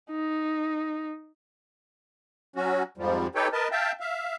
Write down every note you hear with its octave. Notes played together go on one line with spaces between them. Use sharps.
D#4
F#3 C#4 F#4
F2 G#2 F3 G3
D#4 G4 A4 B4 C#5 G5
A#4 B4 D#5 A5
E5 F5 G5 A5
E5 F5